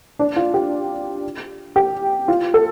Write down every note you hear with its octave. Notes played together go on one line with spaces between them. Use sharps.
D4
F4
G4
G4
F4
A4